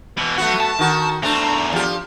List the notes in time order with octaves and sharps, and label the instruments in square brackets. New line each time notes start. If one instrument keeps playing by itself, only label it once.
[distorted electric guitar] B2 E3
[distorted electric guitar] F#3 F#5 [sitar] A3 B3 F#4
[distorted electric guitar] A5
[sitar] D#3 F#4
[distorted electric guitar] E2 A#5 [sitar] A3 C4 D4
[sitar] F3 G4